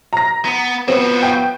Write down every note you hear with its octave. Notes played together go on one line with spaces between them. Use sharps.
A#5 A#6
B3
F3 B3 C4 F#4
G5